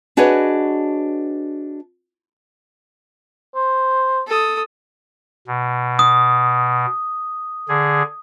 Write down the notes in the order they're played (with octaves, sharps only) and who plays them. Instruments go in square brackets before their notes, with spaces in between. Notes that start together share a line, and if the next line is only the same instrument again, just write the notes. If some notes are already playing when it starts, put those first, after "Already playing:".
[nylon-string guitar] D4 F#4 G#4 B4 C#5 D#5
[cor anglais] C5
[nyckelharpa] A4 D#6
[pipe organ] B2
[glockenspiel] D#6
[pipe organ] D3 G#4